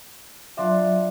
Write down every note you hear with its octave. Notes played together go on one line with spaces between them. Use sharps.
F3 F#3 D4 E5 G5